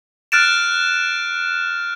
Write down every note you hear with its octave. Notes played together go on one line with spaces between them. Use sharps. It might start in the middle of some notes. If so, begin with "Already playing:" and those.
F6 F#6 A6 D7 E7